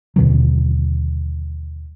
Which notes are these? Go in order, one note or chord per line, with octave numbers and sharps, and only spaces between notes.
D#2 B2 D3 F#3